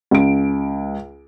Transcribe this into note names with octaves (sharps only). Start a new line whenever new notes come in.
C#2 D7